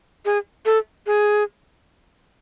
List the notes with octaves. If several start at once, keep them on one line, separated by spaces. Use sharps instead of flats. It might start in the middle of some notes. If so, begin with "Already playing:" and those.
G#4
A4
G#4